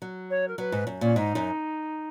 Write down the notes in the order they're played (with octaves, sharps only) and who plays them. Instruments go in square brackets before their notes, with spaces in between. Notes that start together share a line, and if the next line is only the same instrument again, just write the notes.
[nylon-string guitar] F#3
[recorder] C#5
A#4
[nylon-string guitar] F#3 [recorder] B4
[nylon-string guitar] G#2
F#2
[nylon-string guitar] A#2 [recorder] C#4
[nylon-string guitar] G#2 [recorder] D#4
[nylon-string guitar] F#2